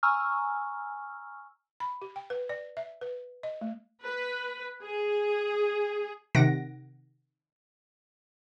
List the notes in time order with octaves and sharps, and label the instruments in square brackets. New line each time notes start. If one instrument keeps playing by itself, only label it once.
[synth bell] G#5 A#5 C#6 E6 F6
[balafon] B5
G4
G5
B4
D5
E5
B4
D#5
A3
[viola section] B4
G#4
[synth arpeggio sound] C3 D#3 F#5 A#6 D7